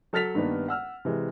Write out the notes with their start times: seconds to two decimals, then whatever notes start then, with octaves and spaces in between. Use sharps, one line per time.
0.13 F#3 A4 F6 A6 B6 F7
0.35 G2 D#3 A#3 B3
0.68 F#5 E6 F6
1.05 C3 E3 G#3